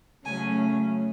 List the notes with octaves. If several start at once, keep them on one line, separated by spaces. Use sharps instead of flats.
C#3 F#3 A3 C#4 G#5